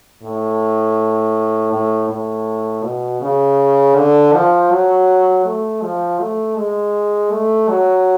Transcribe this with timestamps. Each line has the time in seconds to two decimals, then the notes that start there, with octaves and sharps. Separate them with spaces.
0.23 A2
1.73 A2
2.09 A2
2.84 B2
3.22 C#3
3.96 D3
4.33 F3
4.71 F#3
5.45 A3
5.82 F3
6.19 A3
6.57 G#3
7.31 A3
7.69 F#3